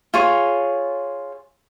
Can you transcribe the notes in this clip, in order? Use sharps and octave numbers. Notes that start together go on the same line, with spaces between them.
F4 G#4 C#5